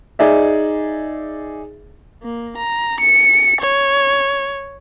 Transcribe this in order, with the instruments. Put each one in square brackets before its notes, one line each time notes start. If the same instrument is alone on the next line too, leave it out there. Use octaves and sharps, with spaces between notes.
[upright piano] D#4 G#4 D5 E5
[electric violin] A#3
A#5
C#7
C#5